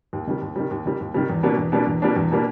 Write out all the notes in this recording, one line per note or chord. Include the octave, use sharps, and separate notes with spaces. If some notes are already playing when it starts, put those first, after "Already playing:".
D#2
D#3 G3
D#2
D#3 G3
D#2
D#3 G3
D#2
D#3 G3
E2
B2 G3 A#3 D4
E2
B2 G3 A#3 D4
E2
B2 G3 A#3 D4
E2
B2 G3 A#3 D4